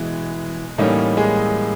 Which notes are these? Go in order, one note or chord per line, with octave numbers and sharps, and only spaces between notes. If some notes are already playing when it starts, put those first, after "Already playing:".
Already playing: B2 E3 G#3 E4
A2 E3 G3 A#3 C#4 D#4
G#3 G#4